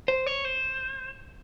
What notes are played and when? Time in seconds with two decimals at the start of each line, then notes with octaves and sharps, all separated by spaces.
0.08 C5
0.26 C#5
0.45 C5